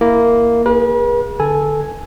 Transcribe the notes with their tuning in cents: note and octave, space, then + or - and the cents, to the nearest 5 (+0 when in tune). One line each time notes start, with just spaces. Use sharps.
A#3 +0 E4 +0
G#4 -20 B4 -45
D3 +0 A4 -10 G#5 +0